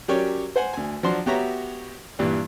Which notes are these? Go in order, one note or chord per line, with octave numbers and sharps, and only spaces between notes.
F#3 C#4 G4 A#4 C#5 D5
C5 F#5 G#5
D2 G#5
F3 F#3 D4 F#4 C6
B3 F#4 G4 C#5 E5 A#5
G2 A#2 E3 G3